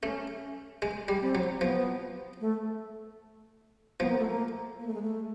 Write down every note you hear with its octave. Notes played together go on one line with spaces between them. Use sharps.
A3 C#4
G#3
G3
C4
F#3
F3 B3
A3
F3 B3
A#3
A3
A#3
A#3
A3
G#3
A3